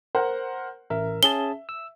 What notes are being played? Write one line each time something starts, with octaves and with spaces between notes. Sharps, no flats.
A#4 C5 F#5
A1 A#4 E5
C#4 G#4 A5 G7
E6